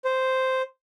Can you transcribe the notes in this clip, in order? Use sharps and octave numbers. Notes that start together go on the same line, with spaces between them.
C5